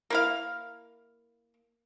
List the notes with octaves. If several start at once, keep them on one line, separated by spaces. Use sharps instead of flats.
A#3 E4 F5